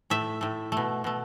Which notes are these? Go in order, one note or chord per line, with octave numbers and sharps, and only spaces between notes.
A2 A3 E5
A2 A3
B2 A3
B2 A3